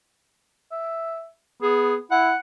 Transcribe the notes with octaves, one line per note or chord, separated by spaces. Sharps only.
E5
B3 G#4
E4 F#5